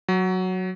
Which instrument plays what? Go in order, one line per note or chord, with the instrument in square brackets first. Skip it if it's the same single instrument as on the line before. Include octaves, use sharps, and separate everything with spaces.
[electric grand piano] F#3